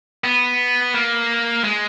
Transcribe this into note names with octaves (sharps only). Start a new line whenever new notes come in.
B3
A#3
G#3